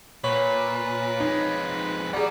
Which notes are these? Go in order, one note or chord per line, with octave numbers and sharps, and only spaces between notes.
A#2 B4 C#5
F2 G#3 D#4
G3 G#4 D5 F#5 A#5